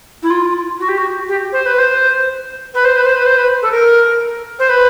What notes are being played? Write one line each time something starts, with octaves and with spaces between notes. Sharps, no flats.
E4
F4
F#4
G4
F#4
G4
C5
B4
C5
B4
C5
B4
C5
B4
C5
B4
A4
A#4
C5
B4